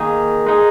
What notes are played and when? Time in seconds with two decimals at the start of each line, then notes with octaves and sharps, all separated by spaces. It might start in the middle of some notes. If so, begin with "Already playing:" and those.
Already playing: D#3 A#3 D#4 G#4
0.46 G#3 D#4 G#4